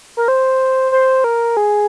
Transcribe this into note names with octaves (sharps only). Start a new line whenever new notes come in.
A#4
C5
C5
A#4
G#4